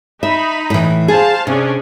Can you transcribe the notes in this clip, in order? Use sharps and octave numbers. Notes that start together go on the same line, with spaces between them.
D#4 E5 B5
A2 E3
G#4 C5 F5 A5
C3 C#4 D4 G#4